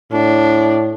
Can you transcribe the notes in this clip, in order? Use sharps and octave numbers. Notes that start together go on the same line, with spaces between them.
A2 D4